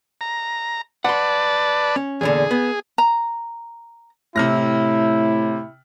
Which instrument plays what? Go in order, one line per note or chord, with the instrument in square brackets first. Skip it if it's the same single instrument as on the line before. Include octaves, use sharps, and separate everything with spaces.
[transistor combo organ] A#5
[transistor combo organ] B4 D5 A5 [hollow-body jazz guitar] F#5 C6
[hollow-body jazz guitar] C#4
[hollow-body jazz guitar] E2 A#2 D3 [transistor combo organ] G#4
[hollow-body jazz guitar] B3
[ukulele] A#5
[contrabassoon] A2 [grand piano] C3 F6 A#6 [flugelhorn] E4